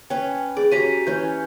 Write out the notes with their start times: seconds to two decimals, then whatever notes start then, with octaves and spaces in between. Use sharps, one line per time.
0.10 C#4 B4 G5
0.57 G#4 D5
0.71 C#4 F#4 G4 A#5 B6 D#7
1.07 E3 C#4 G6